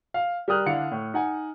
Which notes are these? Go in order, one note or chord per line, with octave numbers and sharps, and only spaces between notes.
F5
G3 A#4 G5 D#6 F6 F#6
D3 D4 E4 F5 C#7
A2
D#4 F#5 G#5